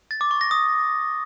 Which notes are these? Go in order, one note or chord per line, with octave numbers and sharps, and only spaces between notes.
A6
D6
C#6
A#6
D#6